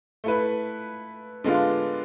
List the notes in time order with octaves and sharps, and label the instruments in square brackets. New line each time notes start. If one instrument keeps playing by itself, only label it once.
[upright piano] A3 E4 B4
D3 G#3 B3 D4 F4